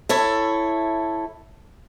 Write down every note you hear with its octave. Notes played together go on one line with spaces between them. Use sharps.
E4 A4 C#5